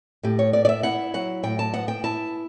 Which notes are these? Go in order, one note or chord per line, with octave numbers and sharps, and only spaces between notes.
A2 G4
C#5
B3 D5
D5
E5
E4 F#5
F#3 F#5
A2 G5
A5
B3 F#5
G5
E4 A5